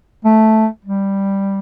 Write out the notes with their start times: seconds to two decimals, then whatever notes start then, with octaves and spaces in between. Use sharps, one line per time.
0.25 A3
0.85 G3